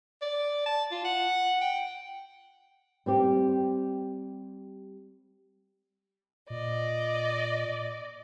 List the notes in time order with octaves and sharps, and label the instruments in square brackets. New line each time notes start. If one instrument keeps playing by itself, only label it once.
[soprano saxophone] D5
A5
F4
F#5
G5
[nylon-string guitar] G3 C4 G4
[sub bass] A#2 [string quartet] D5 D#5